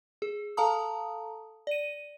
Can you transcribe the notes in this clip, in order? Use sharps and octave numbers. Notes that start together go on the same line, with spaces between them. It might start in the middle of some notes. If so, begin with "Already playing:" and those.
G#4
A4 F5 A5 A#5 D#6
D5 D#7